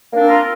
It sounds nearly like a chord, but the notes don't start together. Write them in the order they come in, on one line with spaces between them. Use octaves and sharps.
A#3 D4 C4 A#4 F4